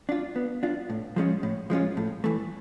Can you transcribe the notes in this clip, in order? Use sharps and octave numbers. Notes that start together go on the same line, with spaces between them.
D4 F4
B3
D4 F4
A2
F3 G#3 C#4 F4
A2
F3 G#3 C#4 F4
A2
E3 A3